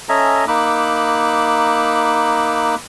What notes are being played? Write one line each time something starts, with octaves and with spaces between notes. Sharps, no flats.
C#4 A4 D#5 E5 G#5 A#5
A#3 D#4 B5 D6 E6 F#6